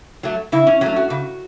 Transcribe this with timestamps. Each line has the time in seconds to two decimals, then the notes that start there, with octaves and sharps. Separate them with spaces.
0.23 F#3 A3
0.52 C#3 E4
0.67 C#4
0.81 F#3 A3 C#4
0.96 F#4
1.10 C#3